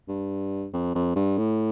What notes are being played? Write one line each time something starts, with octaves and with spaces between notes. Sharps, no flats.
G2
F2
F2
G2
A2